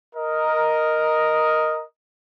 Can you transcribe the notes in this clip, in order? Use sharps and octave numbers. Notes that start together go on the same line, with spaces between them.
A#4 D#5